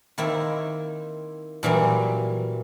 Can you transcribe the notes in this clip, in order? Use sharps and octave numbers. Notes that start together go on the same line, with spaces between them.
D#3 A#3 C4 E4
A#2 E3 F#3 G3